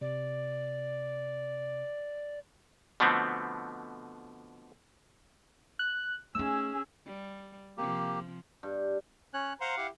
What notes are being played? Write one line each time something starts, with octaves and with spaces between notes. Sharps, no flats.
C3 D5
B2 D3 F3 A3 B3 C4
F#6
A3 C#4 D#4 G#4 E6
G3
C3 F3 A#3 G4
G2
C#4 C#5 F#6
C5 F5 F#5 A#5
E4 G4